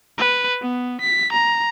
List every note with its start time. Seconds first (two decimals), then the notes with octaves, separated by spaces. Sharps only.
0.18 B4
0.62 B3
1.01 B6
1.32 A#5